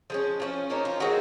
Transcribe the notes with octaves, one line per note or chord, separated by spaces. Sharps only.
F3 G#3 C#4
F3 A#3 C#4
F3 A#3 C#4 D#4
F4
D#3 G#3 C4 F#4